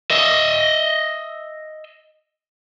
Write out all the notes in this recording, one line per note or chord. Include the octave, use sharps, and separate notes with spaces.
D#5 E5